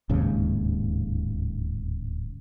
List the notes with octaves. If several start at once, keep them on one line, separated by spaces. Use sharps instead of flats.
D1 D#2 G#2 C#3